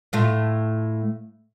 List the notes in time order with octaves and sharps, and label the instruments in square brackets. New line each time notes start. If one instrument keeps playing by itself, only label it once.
[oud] A2 A3 F4